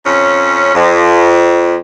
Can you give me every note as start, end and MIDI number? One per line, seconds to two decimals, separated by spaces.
0.06 0.72 41
0.06 0.72 61
0.75 1.75 41